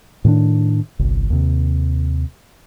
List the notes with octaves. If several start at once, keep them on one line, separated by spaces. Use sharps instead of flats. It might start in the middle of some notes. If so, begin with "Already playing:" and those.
A2 D#3 C#4 D4
G1 C2
D#2 C3